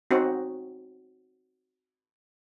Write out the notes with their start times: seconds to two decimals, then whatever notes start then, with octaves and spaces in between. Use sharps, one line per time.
0.11 C4 D#4 F#4